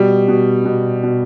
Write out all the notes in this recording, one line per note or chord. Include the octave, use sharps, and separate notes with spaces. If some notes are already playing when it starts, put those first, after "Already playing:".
Already playing: B2 G3
B2
B2
B2